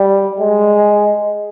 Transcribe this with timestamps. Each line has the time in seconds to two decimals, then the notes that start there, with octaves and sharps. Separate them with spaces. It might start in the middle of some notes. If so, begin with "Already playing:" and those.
Already playing: G3
0.40 G#3